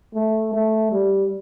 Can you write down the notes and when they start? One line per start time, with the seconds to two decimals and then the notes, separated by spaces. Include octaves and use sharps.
0.15 A3
0.54 A3
0.92 G3